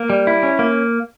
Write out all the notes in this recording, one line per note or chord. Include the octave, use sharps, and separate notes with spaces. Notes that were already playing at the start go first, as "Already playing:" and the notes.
Already playing: A#3
G3
E4
C#4
A#3